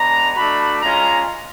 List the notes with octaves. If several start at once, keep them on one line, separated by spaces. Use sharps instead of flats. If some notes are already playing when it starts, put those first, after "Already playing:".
Already playing: G#3 B3 D4 A#5
A3 D4 F#4 B5
G#3 C#4 F4 A#5